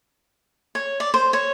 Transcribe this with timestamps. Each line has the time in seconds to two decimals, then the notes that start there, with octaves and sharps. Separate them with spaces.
0.75 C#5
1.00 D5
1.14 C5
1.33 C#5